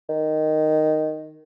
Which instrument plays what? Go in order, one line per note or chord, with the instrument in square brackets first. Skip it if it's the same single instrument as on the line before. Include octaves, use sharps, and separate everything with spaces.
[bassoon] D#3